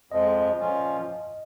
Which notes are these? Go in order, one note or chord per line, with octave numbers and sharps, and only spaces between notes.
F2 F3 G#3 D#5
A#2 F3 C#4 F4